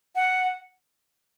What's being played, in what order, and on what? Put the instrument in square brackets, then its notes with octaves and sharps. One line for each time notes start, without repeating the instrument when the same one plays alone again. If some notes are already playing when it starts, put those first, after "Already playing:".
[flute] F#5